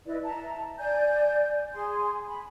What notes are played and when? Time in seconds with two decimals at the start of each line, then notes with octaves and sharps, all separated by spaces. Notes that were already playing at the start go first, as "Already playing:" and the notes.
0.05 E4 B4 D5 D#5
0.23 E5 A5 A#5
0.78 D5 G#5 G6
1.73 G#4 G#5 C6
2.27 B5